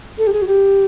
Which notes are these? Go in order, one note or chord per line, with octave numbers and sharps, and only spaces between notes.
A4
G4
G#4
F#4
G4